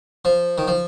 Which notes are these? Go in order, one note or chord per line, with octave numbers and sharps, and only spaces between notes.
F3
D#3
F3